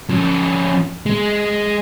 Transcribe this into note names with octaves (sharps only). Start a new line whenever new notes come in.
F3 C#4
G#3